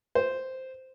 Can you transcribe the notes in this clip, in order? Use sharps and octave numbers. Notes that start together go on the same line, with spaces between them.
C5